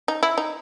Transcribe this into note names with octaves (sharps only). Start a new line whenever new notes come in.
D#4
E4
D#4